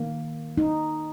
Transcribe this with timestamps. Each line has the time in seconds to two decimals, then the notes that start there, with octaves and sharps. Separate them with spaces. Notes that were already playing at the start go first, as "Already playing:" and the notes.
Already playing: D#3 A#3
0.58 D#4